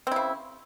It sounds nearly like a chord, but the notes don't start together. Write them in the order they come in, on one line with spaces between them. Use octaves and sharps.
C4 E4 C#3